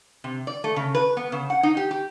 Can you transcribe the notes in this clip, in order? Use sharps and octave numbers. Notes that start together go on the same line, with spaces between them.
C3
D5
A3
C#3
B4
B3
C#3
F#5
D#4
G4
G4